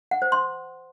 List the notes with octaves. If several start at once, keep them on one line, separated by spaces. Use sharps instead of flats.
F#5
C5
C6